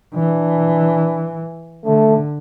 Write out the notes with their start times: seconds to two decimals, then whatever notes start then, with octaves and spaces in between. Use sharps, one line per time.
0.15 E3 D4
1.86 D3 A3